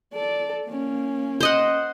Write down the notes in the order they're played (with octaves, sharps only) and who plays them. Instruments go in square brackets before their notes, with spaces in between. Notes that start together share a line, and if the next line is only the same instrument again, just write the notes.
[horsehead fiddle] A4 D5
A#3 C#4
[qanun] C5 D#5 F#5